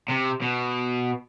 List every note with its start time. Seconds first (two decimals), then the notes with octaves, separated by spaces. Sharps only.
0.08 C3
0.41 B2